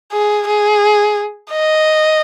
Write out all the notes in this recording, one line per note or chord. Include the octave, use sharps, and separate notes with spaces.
G#4
G#4
D#5